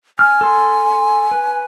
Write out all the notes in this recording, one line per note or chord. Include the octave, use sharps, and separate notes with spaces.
G#5 F6
A4 C6
B4